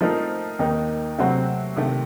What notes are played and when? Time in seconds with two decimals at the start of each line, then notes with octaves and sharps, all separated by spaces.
0.01 F3 A3 C4 D#4 A#4
0.59 D#2 D#3 A#3 D#4
1.19 C3 F#3 A3 C4 F#4
1.76 C3 D#3 A3